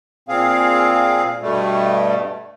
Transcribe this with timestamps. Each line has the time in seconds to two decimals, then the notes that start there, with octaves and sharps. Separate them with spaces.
0.29 A#2 C4 G#4 F5
1.42 G2 B2 G3 A3